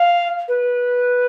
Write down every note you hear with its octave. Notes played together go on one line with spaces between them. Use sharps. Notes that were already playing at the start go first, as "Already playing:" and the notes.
Already playing: F5
B4